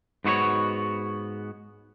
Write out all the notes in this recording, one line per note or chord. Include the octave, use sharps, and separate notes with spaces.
G#2 B3 F#4 B4 C#5